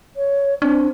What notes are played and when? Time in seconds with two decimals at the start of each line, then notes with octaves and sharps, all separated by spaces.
0.16 C#5
0.62 C4 D4